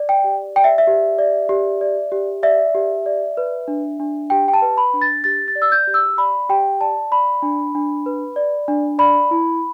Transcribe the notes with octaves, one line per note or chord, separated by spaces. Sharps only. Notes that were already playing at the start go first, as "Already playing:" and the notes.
Already playing: D5
G5
G4
D5 G5
E5
E5
G4
D5
G4
D5
G4
D5 E5
G4
D5
B4
D4
D4
G4 G5
G5
A5
B4
B5
D4
A6
G4 A6
A6
D5
E6
G6
G4
E6
D5 B5
G4 G5
D5 A5
D5 B5
D4
D4
B4
D5
D4
D5 B5
E4